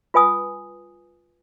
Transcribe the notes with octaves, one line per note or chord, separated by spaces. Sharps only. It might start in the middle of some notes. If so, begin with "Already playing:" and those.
F4 B4 G#5 D#6